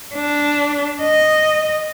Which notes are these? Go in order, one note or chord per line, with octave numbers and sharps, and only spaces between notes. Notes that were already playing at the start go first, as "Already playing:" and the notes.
D4
D#5